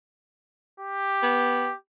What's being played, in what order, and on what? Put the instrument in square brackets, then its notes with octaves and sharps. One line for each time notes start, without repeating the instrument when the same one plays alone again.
[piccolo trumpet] G4
[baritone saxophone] B3